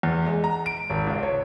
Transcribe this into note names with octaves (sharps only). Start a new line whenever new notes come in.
E2
G#3
A#5
D7
G#1
C#2
C#5